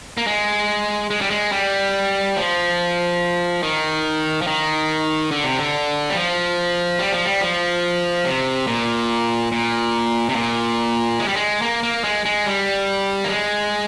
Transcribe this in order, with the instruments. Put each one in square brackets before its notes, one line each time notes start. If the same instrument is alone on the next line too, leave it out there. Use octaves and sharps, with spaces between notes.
[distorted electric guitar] A#3
G#3
G#3
G3
G#3
G3
F3
D#3
F3
D#3
D3
C3
D3
G3
F3
G3
F3
G3
F3
C3
A#2
A#2
C3
A#2
G#3
G3
G#3
A#3
A#3
G#3
G#3
G3
A#3
G#3